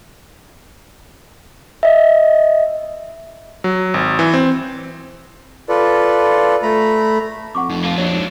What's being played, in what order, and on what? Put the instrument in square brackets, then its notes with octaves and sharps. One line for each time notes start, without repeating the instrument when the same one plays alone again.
[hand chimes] D#5 E5
[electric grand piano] F#3
G#1
E3
C4
[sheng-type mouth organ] F4 A4 B4 D5
A3 A#5 B5
[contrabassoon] F2 [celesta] F#5 C#6 D6
[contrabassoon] F1 [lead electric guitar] F2 [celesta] D#4
[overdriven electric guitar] A#3 F4
[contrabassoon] A#1 [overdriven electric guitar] F#3 D4 [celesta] C#5
[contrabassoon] G#2